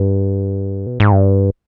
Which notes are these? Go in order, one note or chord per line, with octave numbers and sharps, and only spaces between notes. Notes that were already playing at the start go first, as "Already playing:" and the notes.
Already playing: G2
B2
G#2
G2